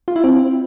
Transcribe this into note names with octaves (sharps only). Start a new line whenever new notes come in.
F4
E4
C4